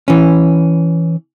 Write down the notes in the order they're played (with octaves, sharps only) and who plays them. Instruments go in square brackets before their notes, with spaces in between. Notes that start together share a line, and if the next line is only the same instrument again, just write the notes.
[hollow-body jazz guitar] E3 C#4